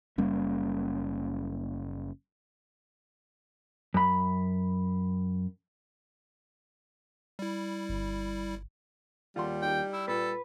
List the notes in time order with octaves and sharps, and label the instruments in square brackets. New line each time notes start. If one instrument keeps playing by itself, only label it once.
[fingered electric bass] F#1 G3 A#3 C#4
[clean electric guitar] F#2 B5
[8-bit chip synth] G3 E4
[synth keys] G1
[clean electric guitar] D#2 F4 [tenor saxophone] G3 [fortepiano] F#5 C6
[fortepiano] D#4 G4 [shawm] G5
[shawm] E4
[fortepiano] A#2 [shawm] A4 [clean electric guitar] B4